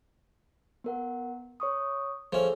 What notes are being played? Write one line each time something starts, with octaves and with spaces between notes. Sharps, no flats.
B3 A#4 F#5
C#5 C#6 D#6
F3 C#4 G#4 A4 E5